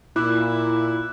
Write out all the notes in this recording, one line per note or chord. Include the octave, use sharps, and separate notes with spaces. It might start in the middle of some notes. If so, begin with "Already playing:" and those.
A#2 E4 D6 F#6